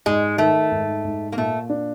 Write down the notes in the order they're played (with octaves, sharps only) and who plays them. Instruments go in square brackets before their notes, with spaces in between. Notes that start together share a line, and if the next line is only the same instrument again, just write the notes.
[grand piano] G#2 [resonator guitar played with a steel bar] G#3
[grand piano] D#3 [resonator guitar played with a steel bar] A3
[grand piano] G#2
G#2
[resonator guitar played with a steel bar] A#3
[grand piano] A#2 [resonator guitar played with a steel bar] A3
[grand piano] D4